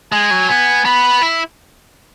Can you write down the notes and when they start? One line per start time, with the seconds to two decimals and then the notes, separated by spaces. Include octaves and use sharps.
0.12 G#3 G#5
0.31 F#3
0.49 B3 G#5
0.85 B3 B5
1.22 E4